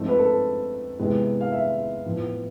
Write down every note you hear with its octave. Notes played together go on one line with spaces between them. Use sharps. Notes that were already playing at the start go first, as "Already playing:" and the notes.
Already playing: G#2 F3 A3 C4
B4
A4
C3 E3 G#3 B3
F5
E5
A2 F3 B3